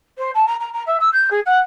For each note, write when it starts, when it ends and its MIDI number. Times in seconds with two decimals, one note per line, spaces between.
0.18 0.31 72
0.34 0.45 81
0.47 0.55 82
0.60 0.70 82
0.73 0.83 82
0.87 0.97 76
1.00 1.09 88
1.13 1.28 91
1.31 1.40 68
1.46 1.58 78